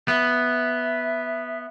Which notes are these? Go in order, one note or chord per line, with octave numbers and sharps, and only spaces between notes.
B3 E5